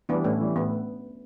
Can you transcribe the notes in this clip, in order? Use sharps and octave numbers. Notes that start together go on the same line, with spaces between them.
E3 G3 B3 D4
A2 A3 C#4
E3 G3
A2 B3